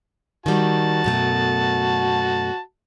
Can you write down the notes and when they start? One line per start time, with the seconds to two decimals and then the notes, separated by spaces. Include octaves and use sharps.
0.46 D#3 G3 F#4 A5
1.04 F#2 B2 A3